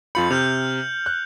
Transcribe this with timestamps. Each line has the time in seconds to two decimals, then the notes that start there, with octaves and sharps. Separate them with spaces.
0.15 F2 F4 B5 G6 C#7 F#7
0.30 C3 F6 G6 F7
1.06 F#6